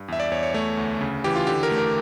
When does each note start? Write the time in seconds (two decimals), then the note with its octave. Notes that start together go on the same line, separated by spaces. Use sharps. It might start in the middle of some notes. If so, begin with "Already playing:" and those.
Already playing: G2
0.08 E2 E5
0.20 D5
0.31 E2 C#5
0.43 C#5
0.54 A3 C#5
0.77 D2
1.01 C#3
1.24 E3 G4
1.36 F4
1.47 D3 G4
1.63 A#4
1.71 A3
1.78 A#4